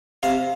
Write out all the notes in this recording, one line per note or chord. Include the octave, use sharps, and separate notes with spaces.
C3 F5